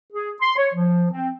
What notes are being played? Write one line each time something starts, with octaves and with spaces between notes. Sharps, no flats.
G#4
C6
C#5
F3
C4